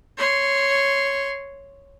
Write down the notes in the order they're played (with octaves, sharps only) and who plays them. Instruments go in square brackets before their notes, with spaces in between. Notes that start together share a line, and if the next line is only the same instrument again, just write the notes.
[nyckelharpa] C#5 C6